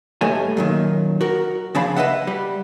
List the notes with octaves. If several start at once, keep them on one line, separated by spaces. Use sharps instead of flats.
G2 A3 A4 C#5 D#5 G#5
F#2 A#2 D#3
F#4 A#4
C#3 F3 D4 G#4 F5 B5
B4 D#5 E5 F#5
G3